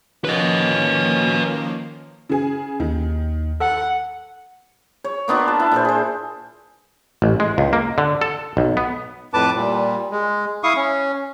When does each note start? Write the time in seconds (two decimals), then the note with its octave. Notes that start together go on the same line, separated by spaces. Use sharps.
0.25 D#3 F3 A#3 C#4 B4 D#5
2.30 C#3 G#4
2.80 D#2 D#3
3.60 A4 F#5
5.04 C#5
5.28 A#3 B3 D4 F4
5.48 A5
5.60 E4
5.71 A#2 A4 C5
5.85 G#4 C5
7.22 A1
7.40 G#3
7.58 C#2
7.73 A#3
7.98 D3
8.21 A4
8.57 B1
8.77 B3
9.34 F2 A2 B4 A5 D6
9.56 A#2 G3
10.11 G#3
10.64 E4 F5 C#6 D#6
10.76 C#4